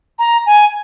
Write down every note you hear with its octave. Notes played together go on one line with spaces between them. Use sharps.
A#5
G#5